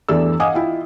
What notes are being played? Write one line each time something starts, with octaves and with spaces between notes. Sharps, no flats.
E2 G2 E3 A3 D5 E6
D#5 F5 F#5 G#5 D6 D#6
E4 F4 G5